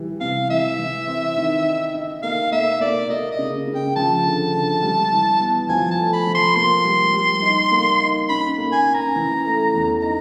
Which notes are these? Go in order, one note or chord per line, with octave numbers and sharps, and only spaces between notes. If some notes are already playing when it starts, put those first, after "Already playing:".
Already playing: E3 G3
C3 F5
E3 E5
E3
C4
D#3
D#4
D#4
A#3 F5
A#3 E5
A#3 D5
A#3 D#5
D#5
C#3
C#3
G5
F3 A5
D3
D3
G3
E3
B3
F3 G#5
A5
A3
B5
F3
C6
A#3 C6
G3
G3
D#4
A#3
D#4
C#4 B5
A#3
G#5
C#4
A#5
E3
A3
E2
D#4 A#5